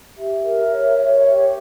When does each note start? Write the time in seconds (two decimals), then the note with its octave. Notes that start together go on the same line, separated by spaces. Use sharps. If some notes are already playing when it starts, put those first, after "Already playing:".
0.16 G4 E5
0.43 A#4
0.70 C#5
0.97 C#5
1.24 G4